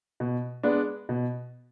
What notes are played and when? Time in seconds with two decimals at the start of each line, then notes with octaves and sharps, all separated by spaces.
0.20 B2
0.63 G#3 B3 D4
1.09 B2